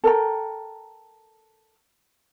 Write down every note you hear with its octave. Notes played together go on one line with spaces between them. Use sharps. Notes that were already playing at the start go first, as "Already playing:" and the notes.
A4 A#4 G5 A#5